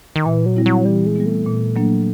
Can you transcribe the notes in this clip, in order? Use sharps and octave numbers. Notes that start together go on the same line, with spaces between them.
D#3
A#2 E3
F#3
G3 C4 E4
F#3
E3 G3
G#3
G3 B3
A3
A#2
F#3 A#3 D4